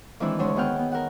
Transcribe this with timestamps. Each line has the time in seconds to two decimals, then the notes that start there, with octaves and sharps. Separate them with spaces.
0.20 D#3 E3 G#3 C4 D4 E4
0.39 D2 D3 G#3 C#5 C6
0.56 D#3 B3 G#4 F#5 G5 F6
0.79 B3
0.92 A#4 F#5